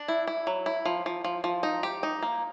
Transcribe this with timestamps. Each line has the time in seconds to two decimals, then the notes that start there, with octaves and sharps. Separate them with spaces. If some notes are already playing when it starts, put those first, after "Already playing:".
Already playing: D4
0.08 E4
0.27 E4
0.47 F#3
0.66 E4
0.86 F3
1.06 F3
1.24 F3
1.44 F3
1.63 D#4
1.83 G4
2.03 D#4
2.22 A#3